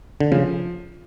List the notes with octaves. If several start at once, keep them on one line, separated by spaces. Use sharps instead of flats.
D3
C#3 F3